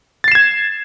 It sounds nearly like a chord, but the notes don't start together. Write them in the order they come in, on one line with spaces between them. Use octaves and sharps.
A6 C7 E7 G#6